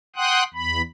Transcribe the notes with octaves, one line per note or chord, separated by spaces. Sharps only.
F#5 G5 C6 D#6 F#6
E2 B5